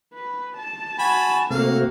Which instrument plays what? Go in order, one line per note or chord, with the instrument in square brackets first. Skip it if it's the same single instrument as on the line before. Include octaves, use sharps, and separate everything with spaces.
[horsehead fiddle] B4
A5
[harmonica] F#4 G#5 B5
[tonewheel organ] C3 A3 C4 [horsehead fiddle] A#3 F#4 [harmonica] F5